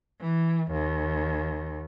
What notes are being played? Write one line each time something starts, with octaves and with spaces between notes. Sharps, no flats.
E3
D#2